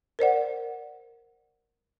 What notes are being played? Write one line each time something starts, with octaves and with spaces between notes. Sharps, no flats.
A#4 C5 D5 F#5